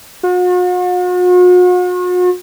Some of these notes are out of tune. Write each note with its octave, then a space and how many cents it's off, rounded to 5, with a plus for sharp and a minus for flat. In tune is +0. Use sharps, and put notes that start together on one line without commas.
F#4 -45